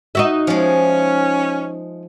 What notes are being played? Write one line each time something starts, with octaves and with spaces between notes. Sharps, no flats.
D#4 F#4 E5
F3 G#3 C#4